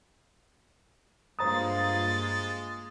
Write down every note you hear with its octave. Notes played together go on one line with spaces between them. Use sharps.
G2 G#3 A#3 F4 C5 A#5 D#6 A6